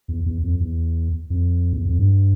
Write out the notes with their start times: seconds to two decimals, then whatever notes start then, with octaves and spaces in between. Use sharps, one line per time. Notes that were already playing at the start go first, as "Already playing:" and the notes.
0.08 E2
0.26 E2
0.43 F2
0.60 E2
1.30 F2
1.73 E2
1.85 F2
1.99 G2